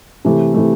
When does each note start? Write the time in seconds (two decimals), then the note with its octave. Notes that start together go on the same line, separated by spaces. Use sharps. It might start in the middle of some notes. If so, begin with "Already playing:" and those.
0.25 C3 E3 A3
0.54 C3 E3 A3